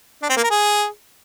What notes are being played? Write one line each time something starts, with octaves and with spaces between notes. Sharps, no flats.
D4
C4
A#3
A#4
G#4